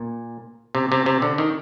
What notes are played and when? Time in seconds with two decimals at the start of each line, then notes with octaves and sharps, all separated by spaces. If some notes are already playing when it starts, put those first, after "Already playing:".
Already playing: A#2
0.75 C3
0.92 C3
1.06 C3
1.22 D3
1.38 D#3